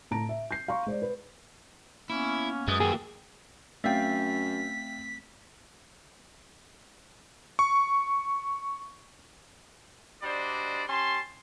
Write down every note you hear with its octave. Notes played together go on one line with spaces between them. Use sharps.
A2 A5 A#5 D7
E5
G6 C7
F5 A#5 C6 C#6
G#3 C5 D5
B4
A#3 B3 C#4 E4
F#2 G#3 B4 D#6
D#3 E3 A#3 G4 G#4 E6
F#2 A3 C4 E5 F5 G5 B6
C#6
G3 D4 F#4 C5 D5 D#5
C#4 G4 A5 C6